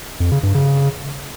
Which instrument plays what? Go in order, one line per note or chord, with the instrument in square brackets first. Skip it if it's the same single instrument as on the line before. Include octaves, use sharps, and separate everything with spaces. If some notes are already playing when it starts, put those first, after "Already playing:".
[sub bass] F2
C#3
G2
C#3